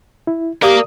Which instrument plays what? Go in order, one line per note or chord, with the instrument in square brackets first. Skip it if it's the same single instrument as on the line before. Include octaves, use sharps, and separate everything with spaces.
[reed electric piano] E4
[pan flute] G4 [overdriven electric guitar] A#4 F5 [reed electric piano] D5 D#6